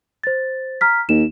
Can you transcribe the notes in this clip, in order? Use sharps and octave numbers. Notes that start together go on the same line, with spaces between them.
C5 A6
A#5 F6 B6
D#2 E7